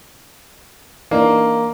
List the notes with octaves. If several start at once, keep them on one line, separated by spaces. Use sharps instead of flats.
E3 A#3 D4 D#4